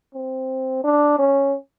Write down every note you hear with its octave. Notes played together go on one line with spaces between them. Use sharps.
C4
D4
C#4